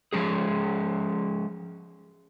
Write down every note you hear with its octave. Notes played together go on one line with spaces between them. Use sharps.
F3 G#3 C#4 G#4